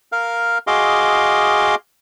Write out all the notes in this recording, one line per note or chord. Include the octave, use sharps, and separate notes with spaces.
A#4 F5
F#4 G#4 D#5 F5 C6 D6